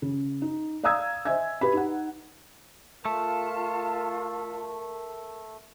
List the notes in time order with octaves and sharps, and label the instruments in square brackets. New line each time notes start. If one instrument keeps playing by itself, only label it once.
[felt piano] C#3
D#4
D5 F5 A#5 D#6 E6 G#6
C5 D#5 E5 G#5 G#6
G4 B4 B5
D#4 F#5
[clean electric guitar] A3 [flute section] F4 [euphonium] A#4 [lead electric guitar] A5